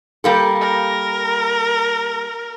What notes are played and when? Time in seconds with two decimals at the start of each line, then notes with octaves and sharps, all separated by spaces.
0.24 G3 A#3 A4
0.61 A#4